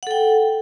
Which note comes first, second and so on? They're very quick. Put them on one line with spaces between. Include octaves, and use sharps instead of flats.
F#5 A4 G5